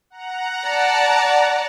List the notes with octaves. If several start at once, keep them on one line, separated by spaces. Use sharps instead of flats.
F#5 A#5
D5 A5